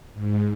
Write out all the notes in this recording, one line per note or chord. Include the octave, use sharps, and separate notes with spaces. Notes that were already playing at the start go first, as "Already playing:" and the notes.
G#2